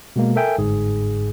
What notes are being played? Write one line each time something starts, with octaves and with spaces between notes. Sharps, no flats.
B2 G#3 A#3
A4 A#4 E5 G5 G#5
G1 G#2 G#4